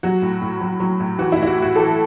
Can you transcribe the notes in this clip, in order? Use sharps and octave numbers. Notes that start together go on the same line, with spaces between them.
F#3 F#4
A2
A2
F#3
F#3
A2
E3 F#4
E4
A2
E4
F#4
A2
F#4
E3 A4